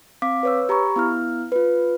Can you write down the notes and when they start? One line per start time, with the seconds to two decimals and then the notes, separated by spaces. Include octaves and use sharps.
0.22 C4 F5 D6 B6
0.43 B4 C#5 E6
0.69 G4 A#5 B5 C#6
0.96 B3 E4 F6
1.52 F4 B4